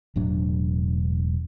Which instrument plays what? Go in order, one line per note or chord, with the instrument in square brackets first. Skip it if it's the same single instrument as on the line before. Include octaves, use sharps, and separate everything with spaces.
[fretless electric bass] E1 A2 F#3 D4